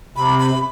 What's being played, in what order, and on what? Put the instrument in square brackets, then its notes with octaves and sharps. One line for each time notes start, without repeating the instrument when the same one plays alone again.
[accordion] C3 [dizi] B5
[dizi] B5